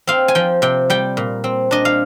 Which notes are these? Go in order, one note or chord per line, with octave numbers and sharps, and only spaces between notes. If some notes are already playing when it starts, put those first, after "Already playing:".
C4 F5
G#5
F3 G5
C3 G5
G3 G5
A#2
C4
D4 D#5
F5